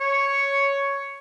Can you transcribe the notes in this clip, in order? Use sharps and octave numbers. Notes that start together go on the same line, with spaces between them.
C#5